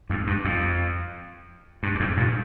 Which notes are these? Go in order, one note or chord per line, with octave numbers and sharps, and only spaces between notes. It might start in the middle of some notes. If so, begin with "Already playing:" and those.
F2 G#2
G2
F2
G2
G2
F2 G#2
G2 A#2